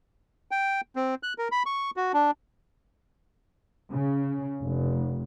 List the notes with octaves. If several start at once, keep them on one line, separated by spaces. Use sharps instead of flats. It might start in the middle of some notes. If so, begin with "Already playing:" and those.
G5
C4
F#6
A#4
B5
C#6
F#4
D4
C#3
F1